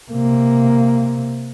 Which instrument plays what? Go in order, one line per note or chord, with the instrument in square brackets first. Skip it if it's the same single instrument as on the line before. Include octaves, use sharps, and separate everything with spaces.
[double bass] C3 A#3